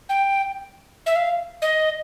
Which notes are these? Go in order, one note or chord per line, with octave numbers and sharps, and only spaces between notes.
G5
E5
F5
D#5